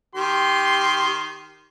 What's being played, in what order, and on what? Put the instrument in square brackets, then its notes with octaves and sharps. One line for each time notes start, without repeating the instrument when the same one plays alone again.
[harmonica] D#3 C6 [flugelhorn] G4